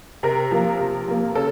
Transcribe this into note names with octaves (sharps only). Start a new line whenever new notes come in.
C3 A#4
F3 A#3
C3
F3 A#3
C#3 A4